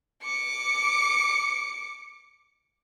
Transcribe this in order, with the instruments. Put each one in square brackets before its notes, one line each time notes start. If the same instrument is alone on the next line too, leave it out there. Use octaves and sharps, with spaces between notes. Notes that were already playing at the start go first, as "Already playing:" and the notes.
[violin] D6 C#7